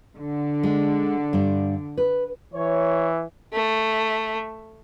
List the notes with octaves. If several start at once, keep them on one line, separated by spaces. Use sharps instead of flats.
D3
G#3
G2 D4
B4
E3 C#5
A3